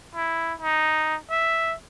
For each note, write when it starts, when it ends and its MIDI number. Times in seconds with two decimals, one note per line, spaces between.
0.15 0.53 64
0.61 1.16 63
1.30 1.74 76